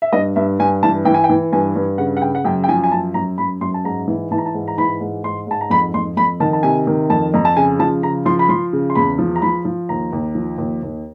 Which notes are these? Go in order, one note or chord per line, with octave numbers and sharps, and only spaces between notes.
E5
G2 D#5
G2 E5
G2 G#5
E3 A5
E3 G5
G#5
G5
E3
G2 G#5
G2
C#3 F#5
F#5
C#3 G5
F#5
F#2 G5
G5
F3 G#5
G#5
F#2 A5
F#2 A#5
F#2 B5
F#2 C6
A5
G#2 A#5
E3
E3 A5
A#5
A5
G#2
A#5
E3 B5
G#2
G#2 C6
G#2 A5
A#5
F2 B5
F2 C6
F2 B5
D#3 A5
A5
C3 G#5
D#3
F2 A5
F2 A#5
A5
C#3 G#5
F3 A5
C#3 A#5
F3 C6
B5
F3 C6
C#3
C6
E2 B5
F3
A#5
F3 B5
F3
D#2 A#5
D#2
F3
D#2
D#2